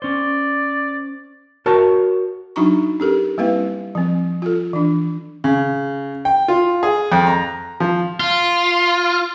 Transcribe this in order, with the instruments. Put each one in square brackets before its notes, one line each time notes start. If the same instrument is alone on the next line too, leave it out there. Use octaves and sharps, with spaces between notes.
[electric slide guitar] C#4 C5 [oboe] D5
[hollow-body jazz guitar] F#4 A#4 C#5 A5
[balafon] F#3 D4 D#4 F#4 A#5 C#6
C#4 G4 A4 A#4
G3 A#3 C4 E4 B4 F5
F3 C4
F4 A4
E3 D4
[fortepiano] C#3
G5
F4
G#4
F2
A#5
F3
[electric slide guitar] F4